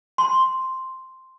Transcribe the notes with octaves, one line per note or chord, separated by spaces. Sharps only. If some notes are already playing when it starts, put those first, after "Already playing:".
C6